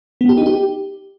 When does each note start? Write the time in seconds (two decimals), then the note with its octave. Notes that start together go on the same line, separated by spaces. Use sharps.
0.21 B3
0.29 G4
0.38 D#4
0.46 G4